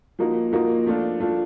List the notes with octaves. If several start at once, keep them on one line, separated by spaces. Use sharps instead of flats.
F3 A#3 D#4 F#4
F3 A#3 D#4 F#4
F3 A3 D4 F4
F3 A3 D4 F4